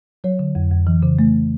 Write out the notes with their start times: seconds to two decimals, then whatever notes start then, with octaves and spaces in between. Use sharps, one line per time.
0.24 F#3 C#5
0.39 D3
0.55 F2
0.71 F2
0.87 E3
1.03 C#3
1.19 A3